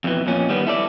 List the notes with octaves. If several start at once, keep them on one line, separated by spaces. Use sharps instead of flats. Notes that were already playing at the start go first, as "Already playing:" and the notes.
F2 B2 E3
F2 A#2 C#4
D#3 G3 B3
E4 A4 D5